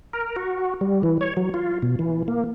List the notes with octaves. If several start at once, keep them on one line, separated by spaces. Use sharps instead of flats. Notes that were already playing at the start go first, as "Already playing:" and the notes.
A#4
F#4
G3
E3
C#5
F#3
F4
B2
E3
A#3